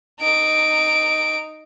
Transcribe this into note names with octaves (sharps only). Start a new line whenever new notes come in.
D#4 D7